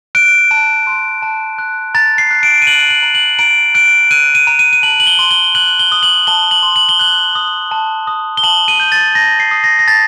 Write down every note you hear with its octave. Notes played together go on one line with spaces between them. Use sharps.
F#6 D7
A5
C6
A5
F#6
A#5 A6
C7
F#6
D7
D#7
F#6 F#7
F#7
A#5
F#7
A#5 D7
F#6 D7
F#6 D#7
D#7
A#5
D#7
D#7
A5 F#7
F#7
G7
C6
G7
F#6 F#7
G7
D#6
F#7
A5 G7
F#7
C6
F#7
G7
F#6 F#7
D#6
A5
D#6
G7
A5 F#7
D#7
G6
A6
A5 A#6
C7
D#6
A#6
A#6
A5 A6